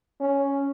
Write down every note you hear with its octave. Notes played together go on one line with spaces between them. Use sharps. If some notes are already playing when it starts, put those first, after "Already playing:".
C#4